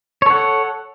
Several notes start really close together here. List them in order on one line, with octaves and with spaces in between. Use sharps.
C#5 A4 F#5